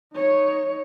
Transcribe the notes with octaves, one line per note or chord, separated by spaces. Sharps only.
D#4 C#5